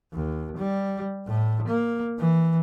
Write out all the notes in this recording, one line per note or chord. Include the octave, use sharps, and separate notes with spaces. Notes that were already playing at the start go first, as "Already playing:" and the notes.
D#2
G3
A2
A#3
E3